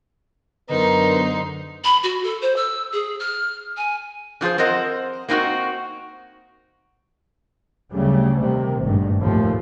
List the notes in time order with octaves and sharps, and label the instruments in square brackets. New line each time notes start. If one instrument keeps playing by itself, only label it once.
[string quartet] F#2 C5 [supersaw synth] D3 C7 [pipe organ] B3 A#4 [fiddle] D#4
[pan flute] B5
F#4
A4
C5
E6
G#4
F6
G#5
[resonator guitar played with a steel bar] D3 F3 F4 G#4 C5
C4 A#4 C5 D#5 F#5
A#3 C4 D#4 F4 F#4
[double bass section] D2 C#3 F#3 G3 A3
C3 D#3
G#1 G2 A#2 D#3 A3
F1 D#2 A2 F3 A3